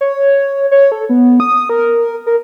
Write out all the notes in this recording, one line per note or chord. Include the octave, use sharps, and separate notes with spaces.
C#5
C#5
A4
B3
D#6
A#4
A#4